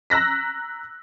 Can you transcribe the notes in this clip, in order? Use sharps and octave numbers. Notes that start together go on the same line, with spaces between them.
A#5 E6 F#6 A#6 B6